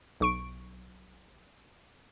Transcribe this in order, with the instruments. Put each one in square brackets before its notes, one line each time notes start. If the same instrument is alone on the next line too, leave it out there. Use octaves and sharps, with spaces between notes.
[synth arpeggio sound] B1 C#6 D7